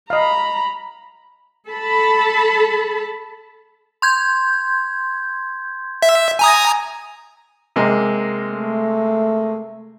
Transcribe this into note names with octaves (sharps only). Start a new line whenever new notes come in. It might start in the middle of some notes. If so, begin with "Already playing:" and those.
D#5 F5 A#5 B5
A4 A5 B5
C6 G6 G#6
E5
G#5 A#5 D#6
C3 G#3 A#3
A3